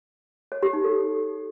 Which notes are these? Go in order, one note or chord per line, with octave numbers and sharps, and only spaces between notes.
C#5
G4
D#4
A4